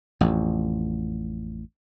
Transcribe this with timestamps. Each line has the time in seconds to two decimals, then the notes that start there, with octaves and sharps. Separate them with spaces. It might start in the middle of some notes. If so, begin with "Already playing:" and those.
0.21 A1 F2